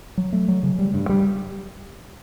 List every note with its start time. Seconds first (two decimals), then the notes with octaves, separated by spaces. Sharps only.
0.18 F#3
0.33 A3
0.48 F#3
0.63 C#3
0.79 G3
0.94 G2
1.09 G3